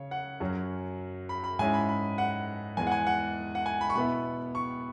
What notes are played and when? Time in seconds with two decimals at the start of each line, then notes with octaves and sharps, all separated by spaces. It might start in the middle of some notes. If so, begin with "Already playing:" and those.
Already playing: C#3 C#5
0.11 F#5
0.40 F#2 F#3 C#4
1.29 B5
1.44 B5
1.59 G#2 G#3 C#4 E4 G#5
1.74 B5
1.89 B5
2.18 F#5
2.77 E2 E3 G#3 G#5
2.87 F#5
2.92 G#5
3.07 F#5
3.55 F#5
3.66 G#5
3.81 B5
3.90 C#6
3.95 B2 B3 E4 B5
4.55 C#6